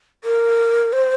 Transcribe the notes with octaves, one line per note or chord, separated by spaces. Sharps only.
A#4
C5